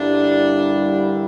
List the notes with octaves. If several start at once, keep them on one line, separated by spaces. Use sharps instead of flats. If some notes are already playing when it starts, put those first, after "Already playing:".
Already playing: G2 D3 G3 A#3 D4 E4